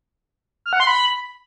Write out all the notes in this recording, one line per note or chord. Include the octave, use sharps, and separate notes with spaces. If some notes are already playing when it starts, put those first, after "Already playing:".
F6
F#5
C6
B5